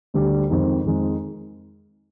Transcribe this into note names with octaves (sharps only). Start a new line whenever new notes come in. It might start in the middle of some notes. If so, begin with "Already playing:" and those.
D2 D3 G3
F2 D#3 G#3 D#4
F2 D#3 G#3 D#4